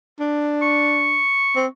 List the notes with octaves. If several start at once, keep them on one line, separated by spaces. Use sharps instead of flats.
D4
C#6
C4